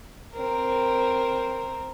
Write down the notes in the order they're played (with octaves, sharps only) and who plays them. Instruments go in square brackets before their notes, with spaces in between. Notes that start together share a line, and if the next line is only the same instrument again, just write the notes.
[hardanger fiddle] C4 A#4